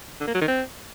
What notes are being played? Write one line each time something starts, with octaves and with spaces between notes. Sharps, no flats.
D3
A#3
F#3
D#3
C4